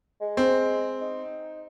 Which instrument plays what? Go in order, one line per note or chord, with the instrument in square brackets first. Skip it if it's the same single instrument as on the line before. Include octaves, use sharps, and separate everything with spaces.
[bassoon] G#3
[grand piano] C4
[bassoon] D#4